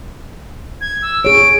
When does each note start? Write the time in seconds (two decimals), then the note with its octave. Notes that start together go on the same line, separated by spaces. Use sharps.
0.81 G#6
1.02 E6
1.25 G#4 C#5 D7